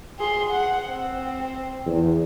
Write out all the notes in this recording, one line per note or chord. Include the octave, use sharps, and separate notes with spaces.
G#4 C6
F#5
C4
E2